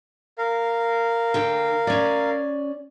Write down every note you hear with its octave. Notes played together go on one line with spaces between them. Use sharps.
A#4 F5
D3 G5
C#4 D5